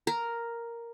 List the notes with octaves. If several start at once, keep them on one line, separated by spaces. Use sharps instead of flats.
A#4